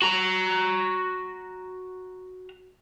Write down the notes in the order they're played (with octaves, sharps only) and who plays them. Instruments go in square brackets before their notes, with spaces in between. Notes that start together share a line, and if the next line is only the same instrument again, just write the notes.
[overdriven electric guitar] F#4 A#5